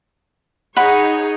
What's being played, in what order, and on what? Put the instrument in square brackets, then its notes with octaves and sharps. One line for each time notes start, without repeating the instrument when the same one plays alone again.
[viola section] D#4 G#4 C#5 [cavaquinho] F#5 B5